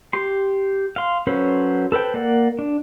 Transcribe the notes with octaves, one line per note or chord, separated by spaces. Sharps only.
G4 C6
F5 C6
F#3 C#4 A4 B4 C5
A4 B4 C5 G5
A#3 D5 F#5
D4